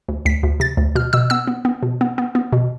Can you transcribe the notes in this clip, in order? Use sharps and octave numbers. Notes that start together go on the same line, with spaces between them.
D2
D2 B6
D2
C3 A6
D2
B2 F6
B2 E6
B3 E6
B3
B3
B2
B3
B3
B3
B2